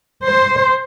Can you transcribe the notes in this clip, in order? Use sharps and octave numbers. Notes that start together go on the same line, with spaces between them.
C5